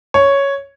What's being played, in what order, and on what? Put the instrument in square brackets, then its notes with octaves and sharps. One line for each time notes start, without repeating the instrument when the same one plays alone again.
[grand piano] C#5